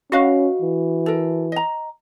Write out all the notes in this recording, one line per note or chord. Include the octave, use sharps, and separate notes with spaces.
C#4 F#4 B4 D#5 F5
E3
A4 A#4
D#5 A#5